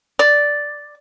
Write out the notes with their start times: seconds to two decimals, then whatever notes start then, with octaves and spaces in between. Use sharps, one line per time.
0.19 D5